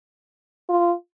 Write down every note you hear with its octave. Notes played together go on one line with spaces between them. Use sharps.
F4